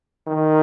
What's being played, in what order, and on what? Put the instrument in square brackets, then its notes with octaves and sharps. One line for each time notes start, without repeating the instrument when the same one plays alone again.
[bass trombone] D#3